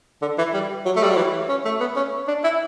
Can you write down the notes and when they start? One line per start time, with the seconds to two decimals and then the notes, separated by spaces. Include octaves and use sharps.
0.22 D3
0.38 E3
0.54 G3
0.85 F#3
0.96 A3
1.03 G3
1.10 F#3
1.17 E3
1.49 C#4
1.65 A3
1.80 B3
1.96 C#4
2.28 D4
2.44 E4